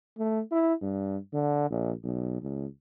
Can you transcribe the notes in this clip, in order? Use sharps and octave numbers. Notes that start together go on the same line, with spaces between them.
A3
E4
G2
D3
A#1
B1
C#2